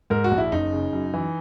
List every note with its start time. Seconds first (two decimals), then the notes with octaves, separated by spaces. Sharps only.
0.10 G#2 A#4
0.24 F#4
0.31 A#1
0.38 E4
0.52 F#1 D#4
0.73 C#3
0.93 F#2
1.14 E3